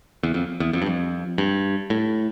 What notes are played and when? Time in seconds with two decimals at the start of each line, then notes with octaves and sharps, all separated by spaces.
0.23 E2
0.34 F2
0.60 E2
0.73 F2
0.82 G2
0.86 F2
1.38 G2
1.90 A2